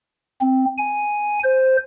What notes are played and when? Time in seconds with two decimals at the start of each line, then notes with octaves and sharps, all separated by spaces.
0.41 C4
0.78 G#5
1.44 C5